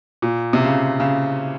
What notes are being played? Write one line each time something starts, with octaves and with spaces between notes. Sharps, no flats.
A#2
C3
C#3
C#3